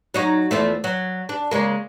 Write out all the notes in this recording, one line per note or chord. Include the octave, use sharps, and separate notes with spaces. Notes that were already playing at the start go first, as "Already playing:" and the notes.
F#3 D#4 F#4
E2 F3 A3
F#3
D4
C#3 G#3 A#3